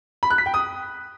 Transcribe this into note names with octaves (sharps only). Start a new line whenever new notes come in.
B5
F#6
B6
G5
D#6